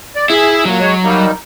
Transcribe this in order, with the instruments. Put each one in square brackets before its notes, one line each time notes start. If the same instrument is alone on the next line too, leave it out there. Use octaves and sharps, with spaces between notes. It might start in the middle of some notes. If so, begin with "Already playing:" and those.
[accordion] D5
[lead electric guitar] E4 [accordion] G#4 E5
[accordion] A#2 [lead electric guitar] F#3
[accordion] G#3 C#5
G3 A#3 D#4